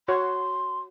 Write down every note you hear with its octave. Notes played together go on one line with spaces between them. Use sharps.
F#4 C#5 C6